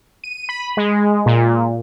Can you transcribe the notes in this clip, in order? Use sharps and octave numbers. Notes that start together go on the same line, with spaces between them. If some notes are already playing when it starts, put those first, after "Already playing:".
D#7
B5
G#3
A#2